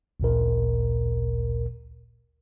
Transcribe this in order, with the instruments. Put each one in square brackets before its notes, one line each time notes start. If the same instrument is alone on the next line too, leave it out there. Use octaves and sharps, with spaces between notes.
[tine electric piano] A1 D2 A#2 A#4